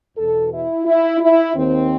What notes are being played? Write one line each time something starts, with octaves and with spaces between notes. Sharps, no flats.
E2 B2 A4
E4
E4
E4
D#2 D#3 C4